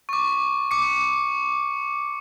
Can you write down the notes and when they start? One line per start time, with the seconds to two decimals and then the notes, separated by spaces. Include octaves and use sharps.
0.09 C#6 D6
0.71 D6 C#7